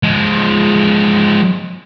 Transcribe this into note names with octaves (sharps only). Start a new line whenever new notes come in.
F3 G#3